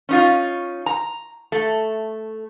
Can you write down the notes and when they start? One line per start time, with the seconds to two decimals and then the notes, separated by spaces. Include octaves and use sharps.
0.09 C#4 D#4 F4
0.86 A#5
1.52 A3